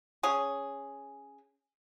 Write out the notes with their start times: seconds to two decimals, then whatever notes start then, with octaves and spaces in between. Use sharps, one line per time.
0.23 C#4 G#4